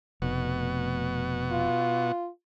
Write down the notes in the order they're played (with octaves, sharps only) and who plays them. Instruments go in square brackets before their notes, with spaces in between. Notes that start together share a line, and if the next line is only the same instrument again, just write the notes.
[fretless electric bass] F1 [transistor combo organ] B2 F#4
[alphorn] F4